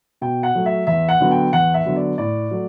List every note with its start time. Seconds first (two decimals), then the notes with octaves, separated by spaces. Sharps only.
0.21 B2 G5
0.43 F#5
0.55 F#3 A3
0.66 E5
0.87 E2 E5
1.09 F#5
1.20 D3 F#3 B3
1.31 G5
1.53 E2 F#5
1.74 E5
1.86 D3 F#3 B3
1.96 D5
2.18 A2 D5
2.51 F#3 A3